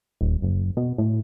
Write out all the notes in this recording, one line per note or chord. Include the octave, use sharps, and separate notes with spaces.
D#1
F#1
B2
A2